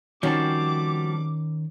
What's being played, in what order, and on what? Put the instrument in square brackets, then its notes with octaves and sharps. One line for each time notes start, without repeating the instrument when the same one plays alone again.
[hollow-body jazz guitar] D#3 C#4 [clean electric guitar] F3 G3 C4 [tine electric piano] F#4 A5 [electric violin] D6